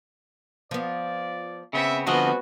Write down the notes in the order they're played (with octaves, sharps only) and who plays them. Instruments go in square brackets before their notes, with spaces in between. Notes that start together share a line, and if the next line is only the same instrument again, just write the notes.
[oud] F3 B3 [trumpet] D5
[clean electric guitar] C#3 B3 C4 [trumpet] E5
[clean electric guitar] D3 F3 [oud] G3 C4 G#4 [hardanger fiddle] B3 F#4 [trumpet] D#5